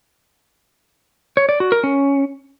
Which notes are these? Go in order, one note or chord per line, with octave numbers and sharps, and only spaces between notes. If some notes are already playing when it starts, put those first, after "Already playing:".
C#5
D5
F#4
A#4
C#4